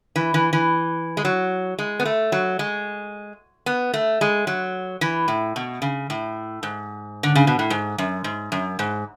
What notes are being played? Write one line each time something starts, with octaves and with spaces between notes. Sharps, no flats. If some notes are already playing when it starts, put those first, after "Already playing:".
E3
E3
E3
G#3
F#3
G#3
B3
A3
F#3
G#3
B3
A3
G#3
F#3
E3
A2
B2
C#3
A2
G#2
D3
C#3
B2
A2
G#2
F#2
G#2
F#2
G#2